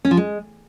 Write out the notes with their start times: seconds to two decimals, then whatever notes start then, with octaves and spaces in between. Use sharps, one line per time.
0.05 C#4
0.11 F3
0.17 G#3